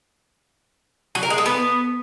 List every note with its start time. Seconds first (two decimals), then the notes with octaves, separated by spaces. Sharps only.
1.15 F#3
1.23 A#4
1.30 G#3
1.38 A4
1.46 B3